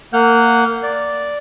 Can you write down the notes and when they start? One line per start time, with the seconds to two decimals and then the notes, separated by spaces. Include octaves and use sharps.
0.13 A#3 F#5 F6 G6
0.83 D5